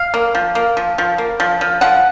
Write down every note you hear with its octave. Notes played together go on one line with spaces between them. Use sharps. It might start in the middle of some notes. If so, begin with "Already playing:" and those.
Already playing: F5
A#3
F3
A#3
F3
F3
A#3
F3
F3
F3 F#5